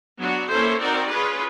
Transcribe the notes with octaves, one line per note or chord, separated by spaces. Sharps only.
F#3 B3 D4 F#4
A#3 C#4 E4 A4 C5
C4 D#4 F#4 A#4 D5
C#4 F4 G#4 B4